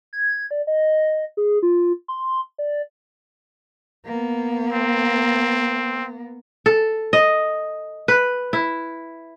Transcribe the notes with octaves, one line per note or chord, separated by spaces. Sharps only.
G#6
D5
D#5
G#4
F4
C6
D5
A#3 B3
C4
A4
D#5
B4
E4